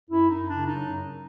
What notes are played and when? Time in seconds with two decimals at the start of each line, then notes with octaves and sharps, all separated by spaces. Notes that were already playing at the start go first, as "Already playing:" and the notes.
0.09 F#2 E4
0.29 F#2 D#4
0.47 C#3 D4
0.66 F#3 D#4
0.85 F#2